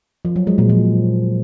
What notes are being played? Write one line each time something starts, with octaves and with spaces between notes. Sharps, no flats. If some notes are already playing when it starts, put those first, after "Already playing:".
F3
F#3
G#3
A#2
F3